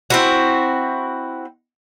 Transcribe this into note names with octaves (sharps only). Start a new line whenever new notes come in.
C4 E4 F#4